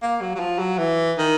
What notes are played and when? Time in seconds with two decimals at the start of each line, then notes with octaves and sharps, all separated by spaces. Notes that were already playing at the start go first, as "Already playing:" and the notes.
0.02 A#3
0.21 F#3
0.36 F#3
0.40 F3
0.59 F#3
0.79 E3
1.18 D#3